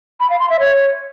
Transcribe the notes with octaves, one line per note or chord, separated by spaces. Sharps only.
B5
F5
C6
E5
C#5